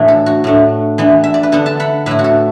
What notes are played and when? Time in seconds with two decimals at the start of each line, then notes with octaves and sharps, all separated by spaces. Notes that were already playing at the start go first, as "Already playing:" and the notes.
Already playing: A2 E3 A3 D4 F#4
0.08 A4
0.26 F#4
0.44 A2 A3 D4
0.98 E3 B3 D4
1.24 E5
1.34 D5
1.43 B4
1.52 D3 B3 D4 A4
1.66 E5 A5
1.80 F#5 B5
2.06 A2 A3 E4 B4 E5
2.19 F#4
2.24 A4